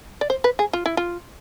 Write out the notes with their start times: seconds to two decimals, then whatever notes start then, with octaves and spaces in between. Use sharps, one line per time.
0.21 D5
0.30 C5
0.44 B4
0.59 G#4
0.73 F4
0.86 E4
0.97 F4